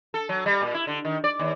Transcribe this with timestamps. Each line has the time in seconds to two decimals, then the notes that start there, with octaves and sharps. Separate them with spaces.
0.14 A4
0.29 F#3
0.46 G3
0.62 A#2
0.74 E4
0.87 D3
1.05 D#3
1.24 D5
1.39 D#2